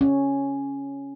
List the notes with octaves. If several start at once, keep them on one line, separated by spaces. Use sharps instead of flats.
C#4